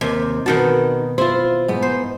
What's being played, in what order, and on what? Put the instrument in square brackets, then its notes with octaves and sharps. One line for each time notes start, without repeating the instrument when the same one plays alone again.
[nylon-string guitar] D#2 [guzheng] C3
[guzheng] B2 D#3 A5 [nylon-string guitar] D#4 F#4
[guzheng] E4 [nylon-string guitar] F4 C5
[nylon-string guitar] G#2 B3
[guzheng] C5